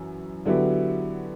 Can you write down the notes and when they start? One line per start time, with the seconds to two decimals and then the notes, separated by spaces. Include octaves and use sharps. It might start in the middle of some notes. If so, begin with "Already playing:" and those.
Already playing: F#2 E3
0.46 D3 F#3 B3 E4 G4